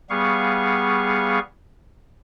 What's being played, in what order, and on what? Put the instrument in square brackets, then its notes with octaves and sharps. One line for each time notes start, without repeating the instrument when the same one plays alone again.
[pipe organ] G3 B3 G#4 F5 C#6